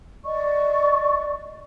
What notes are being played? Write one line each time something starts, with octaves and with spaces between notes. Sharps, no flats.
D5 D#5 C#6